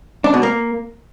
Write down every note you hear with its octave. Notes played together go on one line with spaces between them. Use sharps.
D4
B2
A#3